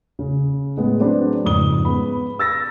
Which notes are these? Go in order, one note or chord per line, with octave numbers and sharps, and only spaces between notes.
C#3
A2 G#3 B3
F#3 C4 D4 B4 C5
F2 G#2 C#3 D#6 G7
G#3 B3 B5
E6 A6 A#6